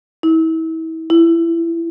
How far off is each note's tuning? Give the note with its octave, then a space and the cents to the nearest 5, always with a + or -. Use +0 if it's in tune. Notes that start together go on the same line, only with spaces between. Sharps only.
E4 -35
E4 +20